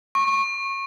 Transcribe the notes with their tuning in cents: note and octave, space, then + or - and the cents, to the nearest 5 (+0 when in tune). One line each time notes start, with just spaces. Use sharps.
C#6 -20